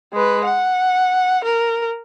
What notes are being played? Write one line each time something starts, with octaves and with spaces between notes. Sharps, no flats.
G#3 B4
F#5
A#4